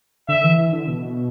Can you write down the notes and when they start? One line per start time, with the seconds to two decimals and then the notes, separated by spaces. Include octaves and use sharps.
0.29 D3 E5
0.44 E3
0.58 E3
0.73 D3
0.88 B2